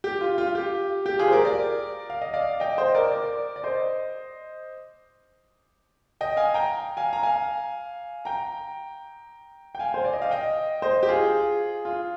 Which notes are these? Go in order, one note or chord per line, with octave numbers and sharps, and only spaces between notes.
G4
F4
F4
G4
G4
F4 G#4
C5
G4 A#4
A#4 D5
F5
D#5
D5 F5
D#5 G5
C5 D#5
A#4 D5
A#4 D5
D5
C5 D#5
D#5 G5
F5 G#5
G5 A#5
F5 G#5
A#5
F5 G#5
G5 A#5
G5
F5 G#5
C5
D5
D#5
F5
D#5 G5
C5 D#5
G4
F4 G#4
F4